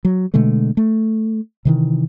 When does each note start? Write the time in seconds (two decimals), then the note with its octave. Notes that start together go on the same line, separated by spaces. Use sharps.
0.05 F#3
0.34 B2 D3 G#3 A3
0.77 A3
1.65 C3 D#3 E3